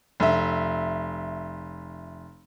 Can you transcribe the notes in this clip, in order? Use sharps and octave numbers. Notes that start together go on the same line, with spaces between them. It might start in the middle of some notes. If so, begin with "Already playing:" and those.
F1 E5